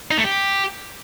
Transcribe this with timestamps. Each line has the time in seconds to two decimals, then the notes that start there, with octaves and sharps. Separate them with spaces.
0.11 D#4
0.18 A3
0.24 G4